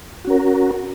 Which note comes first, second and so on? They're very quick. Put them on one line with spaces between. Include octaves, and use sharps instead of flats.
F#4 C#4 A#4